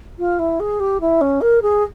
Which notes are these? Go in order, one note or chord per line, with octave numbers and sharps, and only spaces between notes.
F4
E4
G#4
G4
E4
C#4
A#4
G#4